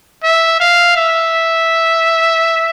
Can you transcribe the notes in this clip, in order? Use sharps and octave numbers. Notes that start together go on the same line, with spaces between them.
E5
F5
E5